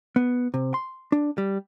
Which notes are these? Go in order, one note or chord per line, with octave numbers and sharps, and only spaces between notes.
B3
C3
C6
D4
G3